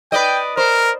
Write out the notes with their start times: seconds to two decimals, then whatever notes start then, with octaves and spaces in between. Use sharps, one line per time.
0.12 B4 D5 D#5 G5
0.57 A#4 C5